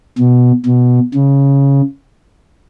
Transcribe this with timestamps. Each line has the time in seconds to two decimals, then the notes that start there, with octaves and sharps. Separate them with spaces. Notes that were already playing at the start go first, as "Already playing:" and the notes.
0.18 B2
0.66 B2
1.14 C#3